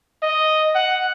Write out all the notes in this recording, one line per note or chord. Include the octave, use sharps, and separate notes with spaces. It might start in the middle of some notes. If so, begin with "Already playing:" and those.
D#5
F#5